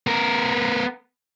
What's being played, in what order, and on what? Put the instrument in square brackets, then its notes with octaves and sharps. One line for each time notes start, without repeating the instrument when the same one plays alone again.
[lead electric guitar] B3 A#4